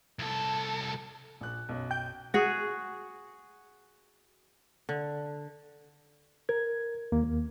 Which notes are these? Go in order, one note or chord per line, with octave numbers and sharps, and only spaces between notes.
C2 A4
A#1 F#6
B1 F#2
G5 G6
F#4 G#4
D3
A#4 G#6
D#2 A#3